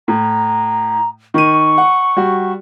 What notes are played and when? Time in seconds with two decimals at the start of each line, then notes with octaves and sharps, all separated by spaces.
0.08 A2 A#5
1.34 D#3 C#6 D#7
1.78 F#5
2.17 G3 F#4